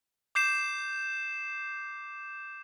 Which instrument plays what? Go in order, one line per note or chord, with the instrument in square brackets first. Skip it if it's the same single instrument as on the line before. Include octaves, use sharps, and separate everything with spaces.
[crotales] D6 G6 C7 E7